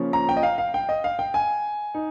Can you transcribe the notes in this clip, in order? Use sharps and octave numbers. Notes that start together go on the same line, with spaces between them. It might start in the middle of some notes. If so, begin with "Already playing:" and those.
Already playing: C#3 F3 A#3 C#4
A#5
G5
D#5
F5
F5
G5
D#5
F5
G5
G#5
D#4